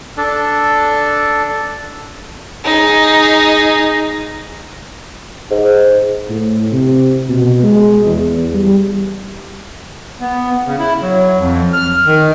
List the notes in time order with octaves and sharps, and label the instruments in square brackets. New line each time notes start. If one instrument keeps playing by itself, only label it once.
[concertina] D4 A4
[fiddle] D#4 G#4
[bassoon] G#2
[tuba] A2
C3
B2
G#3
E2
G3
[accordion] B3
C#3
E4
F#3
F2
F6
D#3